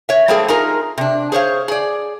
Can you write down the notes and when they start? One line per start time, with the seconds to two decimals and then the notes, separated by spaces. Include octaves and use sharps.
0.09 C#5 E5
0.28 G3 A3 A#3 C4 G#4 A4
0.48 D#4 F4 G#4 A#4
0.98 C3 D4
1.32 G#4 C5 C#5 F5
1.68 G#4 D5